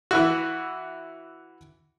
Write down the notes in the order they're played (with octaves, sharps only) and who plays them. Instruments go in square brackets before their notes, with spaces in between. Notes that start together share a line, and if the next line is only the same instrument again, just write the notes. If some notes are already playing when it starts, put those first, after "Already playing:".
[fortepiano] E3 E4 F#4